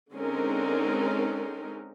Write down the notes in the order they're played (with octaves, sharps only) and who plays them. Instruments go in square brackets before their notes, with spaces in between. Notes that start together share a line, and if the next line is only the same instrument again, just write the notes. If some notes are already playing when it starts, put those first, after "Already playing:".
[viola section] D3 G#3 C4 C#4 D#4 A#4